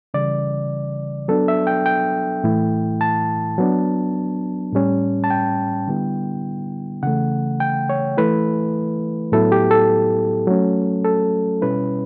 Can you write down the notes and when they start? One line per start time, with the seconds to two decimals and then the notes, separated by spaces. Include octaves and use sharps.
0.14 C#3 E3 G3 D5
1.28 F#3 B3 D4 A4
1.48 E5
1.67 G5
1.86 G5
2.44 A2 E3 A3 E4
3.01 A5
3.58 F#3 B3 D4
4.73 A2 G3 C#4
5.24 A5
5.31 G5
5.88 D3 G3 B3 E4
7.03 C#3 E3 A3 F#5
7.60 G5
7.89 C#5
8.17 E3 A3 E4 B4
9.32 A2 F#3 B3 E4 A4
9.52 G4
9.71 A4
10.47 F#3 A3 C#4
11.05 A4
11.61 B2 G3 C#4 E4 B4